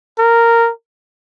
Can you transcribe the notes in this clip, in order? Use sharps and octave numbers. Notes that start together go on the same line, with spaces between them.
A#4